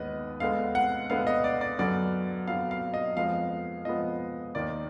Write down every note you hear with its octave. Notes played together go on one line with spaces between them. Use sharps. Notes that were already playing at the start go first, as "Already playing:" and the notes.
Already playing: D#2 D#3 G#3 B3 B4 D#5
D2 D3 G#3 B3 F5
F#5
D2 D3 G#3 B3 F5
D#5
D5
D5
F#2 D3 F#3 B3 D5
F#2 D3 F#3 B3 F5
F5
D#5
F2 F3 G#3 B3 F5
F2 F3 G#3 B3 D#5
D#2 D#3 A#3 D5